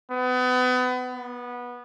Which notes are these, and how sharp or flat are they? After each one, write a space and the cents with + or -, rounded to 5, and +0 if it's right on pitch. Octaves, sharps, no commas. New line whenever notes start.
B3 +30
B3 -15